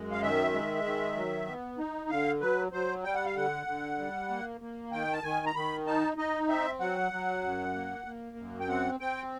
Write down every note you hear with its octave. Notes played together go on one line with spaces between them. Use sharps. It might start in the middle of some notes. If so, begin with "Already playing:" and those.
Already playing: F#2 G#3
F5
D#3 E5
G#3
D#3
F#3
B3
D#4
D3 F5
F#3 B4
F#3 C5
G3 G5
F#5
F5
D3 F#5
D3
G3
A#3
A#3
D#3 G5
A5
D#3 G#5
A#5
D#3 B5
D#4 A5
D#4 D#5
C4 E5
F#3 F#5
F#3
F#2
A#3
A#3
F#2
G5
C4 F#5
C4 G5